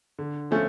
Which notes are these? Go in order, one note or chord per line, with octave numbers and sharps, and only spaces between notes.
D3
F3 A3 C#4 F4